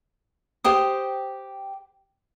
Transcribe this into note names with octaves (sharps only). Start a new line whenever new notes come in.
G4 C5 G5 D#6